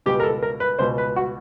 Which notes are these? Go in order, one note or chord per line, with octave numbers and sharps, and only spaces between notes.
C#2 B2 G4
A#4
A4
A#4
B4
C#2 B2 C5
B4
F#4